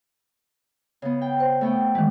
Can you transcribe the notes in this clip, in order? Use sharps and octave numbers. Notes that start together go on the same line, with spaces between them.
C#3 B3
G5
C5
A3 B3 G5
D#3 E3 G#3